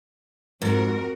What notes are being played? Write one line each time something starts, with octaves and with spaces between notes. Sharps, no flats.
F2 G#2 F#4 A#4